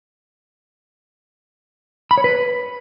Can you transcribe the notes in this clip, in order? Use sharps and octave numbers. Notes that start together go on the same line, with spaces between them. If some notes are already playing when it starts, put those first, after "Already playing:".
B5
C#5
B4